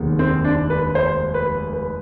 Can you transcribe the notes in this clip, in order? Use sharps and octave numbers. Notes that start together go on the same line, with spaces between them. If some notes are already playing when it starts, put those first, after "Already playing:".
Already playing: F1 D#2 D#3 G#3 B3
C4
D4
B4
C5
B4
B4